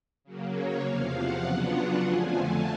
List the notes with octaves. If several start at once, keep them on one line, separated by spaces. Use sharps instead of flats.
C#3 F#3 A#3
C#5
E2 C3 F3 F5
F#5
C#3 F#3 B3 D4 F4
F2 D3 F3 A3 G#5
A5